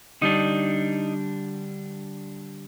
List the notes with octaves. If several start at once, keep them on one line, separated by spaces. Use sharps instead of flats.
D3 G3 D4 D#4